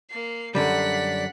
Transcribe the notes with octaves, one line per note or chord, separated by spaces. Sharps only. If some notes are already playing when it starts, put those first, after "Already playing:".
A#3 C7
F#2 D3 G3 D5 F#5 B6